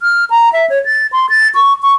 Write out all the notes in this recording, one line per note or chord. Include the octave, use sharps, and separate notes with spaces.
F6
A#5
E5
C#5
A6
C6
A6
C#6
C#6